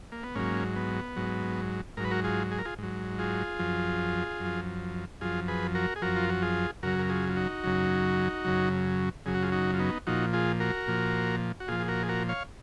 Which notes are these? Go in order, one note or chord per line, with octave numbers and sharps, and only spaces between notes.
A#3
B3
G#2 F#3 A#3 C#4
B3
G#2 F#3
G#2 F#3 A#4 B4
F#4 A#4
F4 G#4
G#4
A#4
F4 G#4
G#2 F#3
F4 G#4
F#2 F3
F#2 F3
F#2 F3 F4 G#4
G#4 B4
F#4 A#4
G#4
F#2 F3 F#4 A#4
F4
F#4
F4 G#4
F#2 C#3 F#3 F#4 A#4
A#4
F4 G#4
F4
D#4 F#4
F#2 C#3 F#3
F#2 C#3 F#3
F#2 C#3 F#3 G#4
F#4
F4 G#4
D#4 F#4
F4
B3 D#4
A#2 F3 D#4 F#4
F4 G#4
F#4 A#4
A#2 F3
F#4
A#2 F3 F4 G#4
G#4
F#4 A#4
G#4
F#4 A#4
C#5 F5